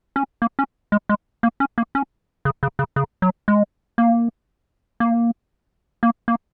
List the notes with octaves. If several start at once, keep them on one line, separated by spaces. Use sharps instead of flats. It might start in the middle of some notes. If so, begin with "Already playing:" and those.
C#4
A#3
C#4
G#3
G#3
A#3
C#4
A#3
C#4
C#3
C#3
C#3
C#3
F#3
G#3
A#3
A#3
A#3
A#3